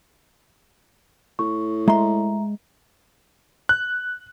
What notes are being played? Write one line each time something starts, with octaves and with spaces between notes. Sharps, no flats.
A2 C#6
G#3 E5 A#5 C6
F#6